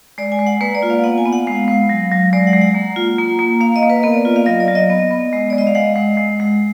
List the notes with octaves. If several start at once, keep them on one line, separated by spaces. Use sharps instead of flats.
G#3 D5
G#5
G#3
F#5
A#3 B4
D5
F4
F5
B3 F#5
G#5
B3
F#5
G#3 F5
G#3
F#3
F#3
G#3 D5
F#5
G#3
F#5
A#3
F4
A#3
A#3
A#3 F5
D#5
A#3
B4
B3 A#4
D5
F4
F5
F#3 D#5
D5
F#3
D#5
B3
B3
G#3
G#3 D5
D#5
F5
G#3 F#5
G#3
G#3
G#3